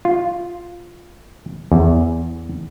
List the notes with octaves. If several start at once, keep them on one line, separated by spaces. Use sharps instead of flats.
F4
E2